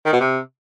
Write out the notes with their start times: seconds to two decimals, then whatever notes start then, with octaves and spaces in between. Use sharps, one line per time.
0.05 D#3
0.13 B2
0.20 C3